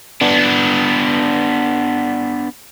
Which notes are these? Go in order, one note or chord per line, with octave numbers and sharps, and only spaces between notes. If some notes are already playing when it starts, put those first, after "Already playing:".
B3 D4